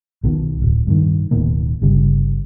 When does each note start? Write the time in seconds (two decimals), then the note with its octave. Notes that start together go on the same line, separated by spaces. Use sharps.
0.23 B1 B2 D#3
0.62 D1
0.87 G2 B2 D#3
1.31 D1 B2 D#3 A#3
1.82 G1 C#3 G3